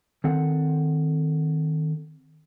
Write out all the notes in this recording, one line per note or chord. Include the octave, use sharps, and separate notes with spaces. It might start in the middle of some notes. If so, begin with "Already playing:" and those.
D#3 C4 A4 F#5